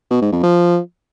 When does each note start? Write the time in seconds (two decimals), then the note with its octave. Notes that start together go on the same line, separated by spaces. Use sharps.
0.11 B2
0.22 G#2
0.32 F2
0.43 F3